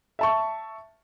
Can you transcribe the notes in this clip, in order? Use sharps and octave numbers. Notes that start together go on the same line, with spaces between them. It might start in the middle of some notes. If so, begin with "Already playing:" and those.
E5 A5 C#6